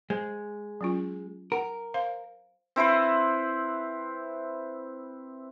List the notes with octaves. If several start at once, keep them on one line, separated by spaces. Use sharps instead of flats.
G#3 C5
F#3 C#4 F4
A#4 F#5
C5 F5 C6
C4 E4 B4 C5